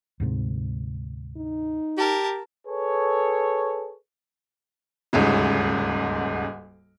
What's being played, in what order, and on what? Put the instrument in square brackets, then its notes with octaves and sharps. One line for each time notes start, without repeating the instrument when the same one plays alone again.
[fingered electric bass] D2 G#2 C3
[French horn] D#4
[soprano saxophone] G4 [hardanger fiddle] A#4 A5
[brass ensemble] G#4 A4 B4 C#5
[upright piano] D#1 D2 G#2 C#3